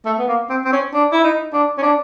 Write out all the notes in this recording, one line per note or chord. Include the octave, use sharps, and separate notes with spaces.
A3
B3
A#3
C4
C4
C#4
D4
E4
D#4
D4
C#4
D4